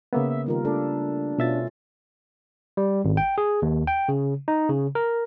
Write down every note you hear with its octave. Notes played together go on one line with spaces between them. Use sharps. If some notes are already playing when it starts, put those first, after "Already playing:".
C#3 A#3 B3 E5
E5
D#3 G3 F4 A#4
A3 D4 F4 A4
B2 C#4 E4 F4 E5 A6
G3
G#1
G5
G#4
D#2
G5
C#3
D#4
C#3
A#4